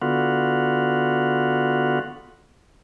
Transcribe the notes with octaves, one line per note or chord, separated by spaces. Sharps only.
D3 B3 F4 F#4